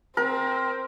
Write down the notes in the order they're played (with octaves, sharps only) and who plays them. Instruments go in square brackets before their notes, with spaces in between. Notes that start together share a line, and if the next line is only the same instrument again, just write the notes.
[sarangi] C4 [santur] A#4